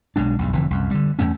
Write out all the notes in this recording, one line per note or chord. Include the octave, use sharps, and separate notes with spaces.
B1 B2 G#3 D4
B1 E2 G2
F1 F2 D3 E3
C2 F#2
D3 G3
E2 A2 A3 C#4